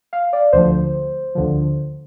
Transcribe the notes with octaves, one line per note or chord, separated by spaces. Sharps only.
F5
D5
D2 D3 F3 C5
D2 D3 F3